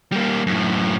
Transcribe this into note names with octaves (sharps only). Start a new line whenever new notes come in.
G3 A#3
F#2 A2